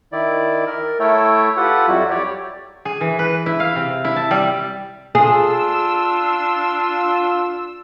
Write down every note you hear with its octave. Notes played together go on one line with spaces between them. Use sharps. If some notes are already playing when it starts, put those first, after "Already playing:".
D#3 E4 D5
A#4
A3 E4 A4 C#5 G5
F4 G4 A4 B4 F#5
F2 F#3 G3 E4 F#4
G4 C#5 D5
G#4
E3
B4
E4
F5
C3
E4
A5
G3
D4 F4 G#4 E6